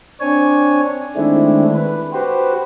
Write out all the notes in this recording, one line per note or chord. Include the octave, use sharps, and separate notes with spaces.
C4 D4 C#5 G#5
D#3 G#3 A3 C4 D4 E4
B4
F#4 G4 B4 C5